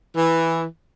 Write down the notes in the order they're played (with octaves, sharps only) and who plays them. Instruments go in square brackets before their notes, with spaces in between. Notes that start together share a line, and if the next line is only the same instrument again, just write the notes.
[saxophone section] E3